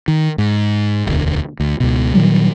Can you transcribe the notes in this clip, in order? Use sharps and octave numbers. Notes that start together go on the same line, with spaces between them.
D#3
G#2
E1 D2
D2
C#2 B2
A#2 D#3 F#3 G3